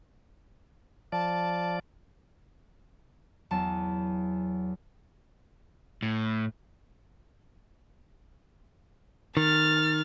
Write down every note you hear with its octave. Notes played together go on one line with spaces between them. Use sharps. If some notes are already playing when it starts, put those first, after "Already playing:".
F3 D5 A5
E2 F#3 A5
A2
D#3 F6 A6